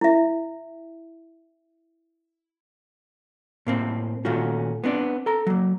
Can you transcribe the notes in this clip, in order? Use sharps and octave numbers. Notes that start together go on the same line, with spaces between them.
E4 E5
A2 A#3 C4
A#2 D#3 A3 C#4 F4 F#4
B3 C4 D4 D5
A4 A#5
F#3 A#3